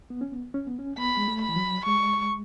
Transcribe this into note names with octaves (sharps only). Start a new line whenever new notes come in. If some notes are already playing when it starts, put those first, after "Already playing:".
B3
C#4
B3
C#4
B3
C#4
B3 B5
G#3
A3
B5
E3
F#3
G#3 C#6